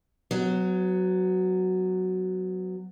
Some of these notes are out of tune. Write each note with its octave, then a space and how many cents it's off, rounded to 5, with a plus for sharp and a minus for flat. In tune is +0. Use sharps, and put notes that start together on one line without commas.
F#3 +0 B3 +35